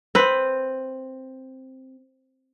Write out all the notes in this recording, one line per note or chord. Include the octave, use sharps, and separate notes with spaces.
C4 B4